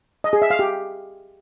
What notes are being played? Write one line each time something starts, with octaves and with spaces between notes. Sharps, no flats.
D#5
G#4
E5
F5
G4